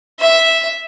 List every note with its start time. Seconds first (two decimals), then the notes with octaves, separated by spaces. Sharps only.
0.20 E5